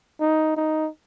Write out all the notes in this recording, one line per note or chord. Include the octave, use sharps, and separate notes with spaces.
D#4
D#4